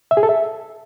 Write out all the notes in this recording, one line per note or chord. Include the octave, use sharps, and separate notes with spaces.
E5
G#4
A4
E5